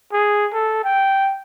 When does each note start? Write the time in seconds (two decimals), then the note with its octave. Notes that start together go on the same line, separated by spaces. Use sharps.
0.13 G#4
0.53 A4
0.84 G5